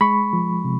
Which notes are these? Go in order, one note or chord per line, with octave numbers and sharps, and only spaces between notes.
G#3 B5 C#6
F3
C3